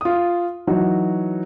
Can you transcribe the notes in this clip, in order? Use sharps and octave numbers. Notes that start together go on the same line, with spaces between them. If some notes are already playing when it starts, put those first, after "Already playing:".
F4 D#6
E3 F#3 D#4 F#4